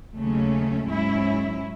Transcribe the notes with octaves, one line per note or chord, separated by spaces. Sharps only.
D#2 C#3 F#3 A3 C#4
G#2 F#3 C#4 E4